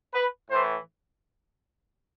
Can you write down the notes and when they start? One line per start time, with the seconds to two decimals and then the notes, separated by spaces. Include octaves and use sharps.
0.14 B4
0.50 A2 E3 C5